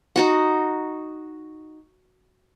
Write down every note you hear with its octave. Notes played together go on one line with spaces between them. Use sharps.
D#4 F#4 F#5